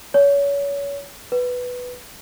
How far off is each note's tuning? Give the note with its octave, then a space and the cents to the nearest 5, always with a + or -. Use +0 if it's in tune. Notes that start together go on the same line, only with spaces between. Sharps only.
C#5 +30
B4 +0